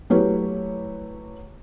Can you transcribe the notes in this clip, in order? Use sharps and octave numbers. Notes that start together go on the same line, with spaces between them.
F#3 A3 E4 G4 B4 C#5